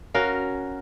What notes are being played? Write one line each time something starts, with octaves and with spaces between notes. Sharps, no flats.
C#4 F#4 A#4 F5